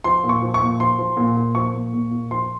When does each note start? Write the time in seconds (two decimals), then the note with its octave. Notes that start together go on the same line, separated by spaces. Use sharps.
0.04 F3 C6
0.24 A#2
0.29 C#6
0.42 F3
0.54 C#6
0.61 A#2
0.80 F3 C6
0.98 F3
1.17 A#2
1.37 A#2
1.55 F3 C#6
1.73 A#2
1.93 A#2
2.11 A#2
2.31 F3 C6